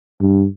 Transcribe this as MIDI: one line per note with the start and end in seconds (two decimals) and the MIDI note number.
0.20 0.46 43